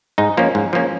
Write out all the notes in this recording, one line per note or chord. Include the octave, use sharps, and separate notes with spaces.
G#2 D#4
F3 A#3 C#4
G#2
F3 A#3 C#4